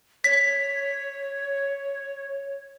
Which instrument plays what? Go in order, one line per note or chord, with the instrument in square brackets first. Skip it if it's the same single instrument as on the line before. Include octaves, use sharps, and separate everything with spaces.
[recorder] C#5 [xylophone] B6